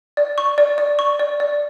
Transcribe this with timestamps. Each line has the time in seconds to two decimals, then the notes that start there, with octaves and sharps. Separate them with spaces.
0.17 D5
0.38 C#6
0.58 D5
0.78 D5
0.99 C#6
1.20 D5
1.40 D5